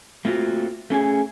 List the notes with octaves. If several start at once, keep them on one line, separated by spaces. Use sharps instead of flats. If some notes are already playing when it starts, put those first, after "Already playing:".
A3 A#3 C4 F4 F#4
A3 C#4 G#4 G#5